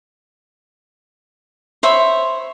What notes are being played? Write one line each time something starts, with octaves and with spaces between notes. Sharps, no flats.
C5 C#5 E5 B5